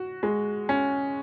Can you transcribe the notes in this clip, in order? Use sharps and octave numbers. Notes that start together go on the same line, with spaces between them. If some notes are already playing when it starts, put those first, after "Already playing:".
Already playing: F#4
G#3
C#4